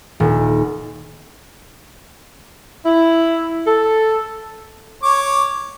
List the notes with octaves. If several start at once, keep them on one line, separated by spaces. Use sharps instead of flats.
D#1
E4
A4
C#5 D6